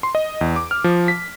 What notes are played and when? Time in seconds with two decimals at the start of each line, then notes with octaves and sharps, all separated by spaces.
0.03 C6
0.15 D#5
0.41 E2
0.56 D6
0.71 F6
0.84 F3
1.08 B6